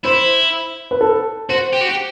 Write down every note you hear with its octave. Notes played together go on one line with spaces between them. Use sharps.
E4 C5
B4
A4
F#4 C5
G4
F#4
G4